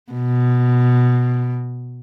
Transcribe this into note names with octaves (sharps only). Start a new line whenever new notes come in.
B2